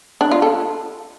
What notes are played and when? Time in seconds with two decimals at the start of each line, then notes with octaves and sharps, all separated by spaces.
0.21 D4
0.31 F4
0.42 A4